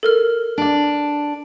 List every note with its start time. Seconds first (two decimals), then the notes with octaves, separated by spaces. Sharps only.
0.03 A4 A#4 F6
0.58 D4 D5